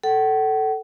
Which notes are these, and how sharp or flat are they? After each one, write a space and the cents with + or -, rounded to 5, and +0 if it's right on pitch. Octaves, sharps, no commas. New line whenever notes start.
A4 +0 F#5 +40